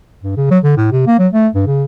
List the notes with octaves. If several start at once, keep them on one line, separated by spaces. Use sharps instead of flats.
G2
C#3
F#3
D3
A2
C3
A#3
F#3
A3
G2
C#3